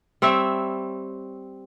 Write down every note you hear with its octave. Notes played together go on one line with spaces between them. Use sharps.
G3 C4 C#5 E5